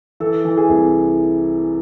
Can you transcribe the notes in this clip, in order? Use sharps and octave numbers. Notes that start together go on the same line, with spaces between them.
E3 A4
E3
G#4
C2